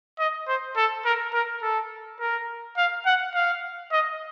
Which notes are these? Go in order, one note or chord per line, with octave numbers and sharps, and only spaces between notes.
D#5
C5
A4
A#4
A#4
A4
A#4
F5
F#5
F5
D#5